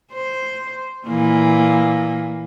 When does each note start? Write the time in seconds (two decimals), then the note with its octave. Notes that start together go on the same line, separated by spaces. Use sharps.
0.13 C5
1.06 A#2 E3 A#3